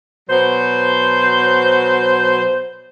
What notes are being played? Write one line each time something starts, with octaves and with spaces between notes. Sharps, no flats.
B2 F#3 C5